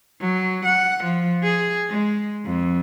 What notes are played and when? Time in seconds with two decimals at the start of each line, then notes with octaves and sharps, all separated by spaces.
0.20 F#3
0.65 F#5
1.04 F3
1.44 G#4
1.90 G#3
2.45 F2